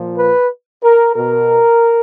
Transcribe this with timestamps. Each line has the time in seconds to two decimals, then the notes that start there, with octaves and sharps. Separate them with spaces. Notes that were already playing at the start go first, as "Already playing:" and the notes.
Already playing: A#2 F3
0.17 B4
0.82 A#4
1.14 B2 A#4